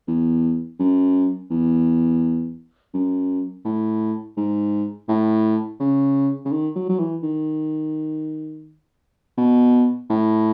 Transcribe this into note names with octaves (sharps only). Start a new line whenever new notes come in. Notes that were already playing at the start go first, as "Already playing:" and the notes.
E2
F#2
E2
F#2
A2
G#2
A2
C#3
C#3
D#3
F#3
F#3
E3
D#3
B2
A2